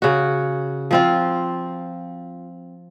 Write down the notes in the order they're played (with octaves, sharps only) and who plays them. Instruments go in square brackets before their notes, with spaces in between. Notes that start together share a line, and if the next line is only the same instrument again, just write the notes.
[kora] C#3 F#4
F3 C4 F4